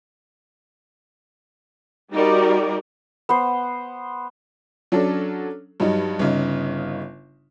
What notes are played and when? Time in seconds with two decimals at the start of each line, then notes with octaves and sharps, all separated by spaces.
2.13 G3 D#4 F#4 G4 A#4 D5
3.29 B3 C5
4.92 F#3 C#4 D4 A4
5.80 G2 F#3 G3 D#4
6.19 G1 C#3 D#4